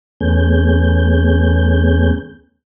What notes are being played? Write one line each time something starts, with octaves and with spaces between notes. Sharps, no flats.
E2 A3 B3 C#4 G#4 G6